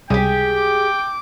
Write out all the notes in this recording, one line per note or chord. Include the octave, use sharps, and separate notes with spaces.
C#2 C3 G3 G4 G#4 G5
D6